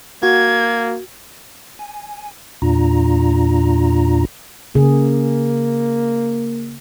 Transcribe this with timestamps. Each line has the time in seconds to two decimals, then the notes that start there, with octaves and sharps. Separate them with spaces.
0.23 A#3 F#4 G#6
1.79 G#5
2.62 E2 A#2 D4 F4 A#5
4.75 C#3 A#3 G#4